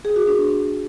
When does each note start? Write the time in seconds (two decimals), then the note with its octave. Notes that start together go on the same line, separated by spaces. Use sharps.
0.05 G#4
0.16 F#4
0.27 D4